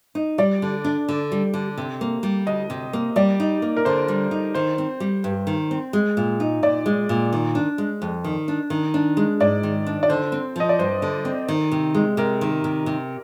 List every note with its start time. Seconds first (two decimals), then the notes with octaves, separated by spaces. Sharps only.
0.15 D#4
0.38 G3 D5
0.62 D3
0.85 D4
1.09 D3
1.32 G3
1.54 D3
1.77 C3
2.01 A#3
2.23 G3
2.47 D2 D#5
2.70 C3
2.93 A#3
3.16 G3 D5
3.40 D#4
3.62 A#3
3.77 A#4
3.85 D3 C5
4.08 G3
4.31 D#4
4.54 D#3 C5
4.78 C4
5.00 G3
5.24 G2
5.47 D#3
5.71 C4
5.93 G#3
6.17 A#2
6.40 D#4
6.63 A#2 D5
6.86 G#3
7.09 A#2
7.33 D#3
7.55 D4
7.78 G#3
8.02 F2
8.24 D#3
8.48 D4
8.70 D#3
8.94 D4
9.17 G#3
9.40 G#2 D5
9.63 D#3
9.87 D4
10.03 D5
10.09 D3 C5
10.32 C4
10.56 F3 D#5
10.69 D5
10.79 G2 C5
11.02 D3
11.25 C4
11.48 D#3
11.72 C3
11.94 G#3
12.17 C3 A#4
12.41 D#3
12.64 C3
12.86 C3